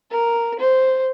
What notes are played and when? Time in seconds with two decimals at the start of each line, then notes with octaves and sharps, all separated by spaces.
0.11 A#4
0.59 C5